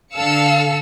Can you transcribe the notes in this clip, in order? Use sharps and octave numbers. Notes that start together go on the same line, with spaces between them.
D3 A4 F5 E6 C#7